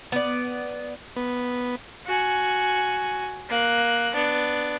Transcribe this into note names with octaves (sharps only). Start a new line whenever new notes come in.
B3 D5
B3
F#4 G#5
A#3 F#6
B3 D4